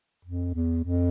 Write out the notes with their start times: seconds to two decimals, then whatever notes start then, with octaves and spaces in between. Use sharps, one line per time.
0.25 F2
0.54 E2
0.84 F2